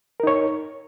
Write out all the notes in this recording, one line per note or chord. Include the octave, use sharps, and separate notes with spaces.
D#4 A#4 C#5